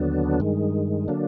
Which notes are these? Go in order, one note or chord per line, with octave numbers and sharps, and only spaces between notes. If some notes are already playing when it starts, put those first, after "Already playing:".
Already playing: D#2 D3 F#3 B3 D4
G2 D#3 G#3
D3 F#3 A#3 D4